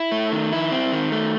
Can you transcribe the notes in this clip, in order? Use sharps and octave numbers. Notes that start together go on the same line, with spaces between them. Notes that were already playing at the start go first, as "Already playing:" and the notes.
Already playing: E4
A3
D#3
E4
C4
D#3
A3